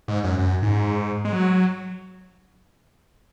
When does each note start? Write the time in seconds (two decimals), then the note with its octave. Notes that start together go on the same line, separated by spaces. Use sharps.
0.08 G#2
0.24 F#2
0.39 F#2
0.62 G#2
1.25 G#3
1.33 F#3